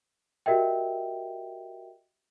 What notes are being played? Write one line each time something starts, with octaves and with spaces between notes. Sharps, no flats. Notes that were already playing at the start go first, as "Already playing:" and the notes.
F#4 G4 A#4 D#5 E5 G5